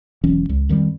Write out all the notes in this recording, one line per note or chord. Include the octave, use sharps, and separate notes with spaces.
E1 E3 F#3 C#4
C#2
F2 D#3 F3 G3